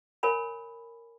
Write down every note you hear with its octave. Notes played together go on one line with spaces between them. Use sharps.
A#4 C#5 G#5 B5